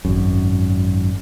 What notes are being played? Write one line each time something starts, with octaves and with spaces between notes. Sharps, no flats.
G#1 F#2